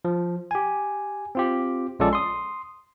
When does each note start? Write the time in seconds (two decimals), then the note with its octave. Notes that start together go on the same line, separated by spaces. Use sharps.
0.05 F3
0.51 G4 G#5
1.35 C4 F4 G4
1.99 A#1 G#3 C#4 F4 A4 D5
2.13 C6 D#6